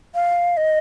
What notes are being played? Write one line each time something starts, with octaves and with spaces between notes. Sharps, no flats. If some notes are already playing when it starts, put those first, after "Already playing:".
F5
D#5